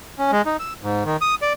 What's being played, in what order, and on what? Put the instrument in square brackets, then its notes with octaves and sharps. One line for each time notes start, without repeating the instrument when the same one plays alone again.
[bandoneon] C#4
G#3
D#4
E6
G#2
D#3
D#6
D5